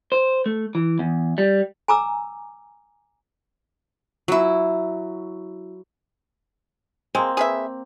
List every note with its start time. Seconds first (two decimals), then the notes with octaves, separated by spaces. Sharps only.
0.12 C5
0.46 A3
0.75 E3
0.99 E2
1.38 G3
1.88 G#5 A#5 D6 E6
4.28 F#3 E4
7.15 G#3 A#3 C4
7.37 G#4 B4 E5